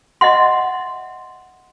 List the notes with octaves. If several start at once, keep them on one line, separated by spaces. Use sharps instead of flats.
D#5 E5 F#5 C6